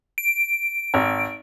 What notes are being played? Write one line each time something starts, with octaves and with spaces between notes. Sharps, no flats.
D7
G#1